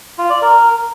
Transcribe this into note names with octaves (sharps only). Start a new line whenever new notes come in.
F4
D5
A#4